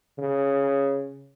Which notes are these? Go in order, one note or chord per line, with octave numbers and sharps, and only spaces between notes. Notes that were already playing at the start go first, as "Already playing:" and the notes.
C#3